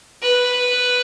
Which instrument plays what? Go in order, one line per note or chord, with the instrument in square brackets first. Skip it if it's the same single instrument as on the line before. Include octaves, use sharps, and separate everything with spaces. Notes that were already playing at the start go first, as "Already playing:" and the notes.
[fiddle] B4